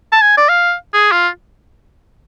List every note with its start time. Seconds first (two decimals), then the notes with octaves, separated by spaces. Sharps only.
0.12 A5
0.21 G#5
0.37 D5
0.49 F5
0.94 G#4
1.12 F4